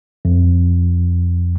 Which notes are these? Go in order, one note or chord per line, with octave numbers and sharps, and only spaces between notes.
F2